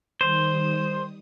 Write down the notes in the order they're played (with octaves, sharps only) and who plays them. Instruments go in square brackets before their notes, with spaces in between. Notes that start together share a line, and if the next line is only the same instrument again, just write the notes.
[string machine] D#3 G3 D#6 [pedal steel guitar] C5